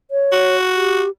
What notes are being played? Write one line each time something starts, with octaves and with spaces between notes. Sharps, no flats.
C#5
F#4
G4